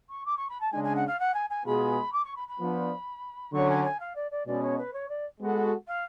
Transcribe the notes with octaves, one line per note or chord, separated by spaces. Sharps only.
C#6
D6
C#6
B5
A5
C#3 G#3 D4 G#5
G#5
F#5
F5
F#5
G#5
G#5
B2 G#3 B3 F4 G#4 B5
D6
C#6
B5
B5
F3 B3 D4
D3 F#3 C#4 C#6
G#5
G#5
F5
D5
D5
B2 G#3 C#4 D5
C#5
B4
C#5
D5
G#3 B3 F#4 A4
F5